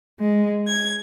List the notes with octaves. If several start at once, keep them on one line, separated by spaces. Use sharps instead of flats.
G#3
G#6